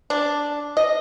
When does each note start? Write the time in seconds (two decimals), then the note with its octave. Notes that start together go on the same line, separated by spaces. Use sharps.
0.10 D4
0.77 D#5